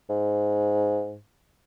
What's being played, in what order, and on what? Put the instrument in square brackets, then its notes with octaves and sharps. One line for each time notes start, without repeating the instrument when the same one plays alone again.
[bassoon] G#2